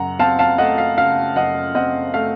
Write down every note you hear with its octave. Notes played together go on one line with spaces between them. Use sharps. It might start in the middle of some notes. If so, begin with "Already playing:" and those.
Already playing: F#2 C#3 F#5 A#5
C4 F5 A5
F5 A5
A3 D#5 F#5
F5
C#3 F5
F#2 D#5 F#5
C4 D#5 F#5
A3 F5